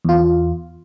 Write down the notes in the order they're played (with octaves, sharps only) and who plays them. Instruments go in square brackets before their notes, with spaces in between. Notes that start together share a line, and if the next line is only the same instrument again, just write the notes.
[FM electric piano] E2 F4